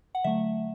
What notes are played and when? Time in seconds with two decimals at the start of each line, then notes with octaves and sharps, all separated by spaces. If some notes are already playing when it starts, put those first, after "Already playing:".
0.15 F#5
0.24 D3 F#3 A3 E5